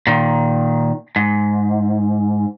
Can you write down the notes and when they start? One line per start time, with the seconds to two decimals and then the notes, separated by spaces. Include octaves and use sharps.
0.07 A#2 D#3
1.16 G#2